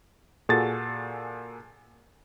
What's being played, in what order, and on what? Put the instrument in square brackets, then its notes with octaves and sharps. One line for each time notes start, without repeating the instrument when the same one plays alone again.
[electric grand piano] A#2 F#4 G#4 A4 A6